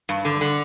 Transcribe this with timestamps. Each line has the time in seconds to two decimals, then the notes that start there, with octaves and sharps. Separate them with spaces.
0.09 G2
0.25 D3
0.41 D3